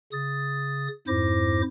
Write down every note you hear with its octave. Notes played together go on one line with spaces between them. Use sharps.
C#3 D#6 A6
F2 G#2 E4 C5 D6 A#6